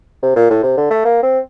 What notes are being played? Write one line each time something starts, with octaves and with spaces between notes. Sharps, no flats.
C3
A#2
A2
C3
D3
A3
A#3
C4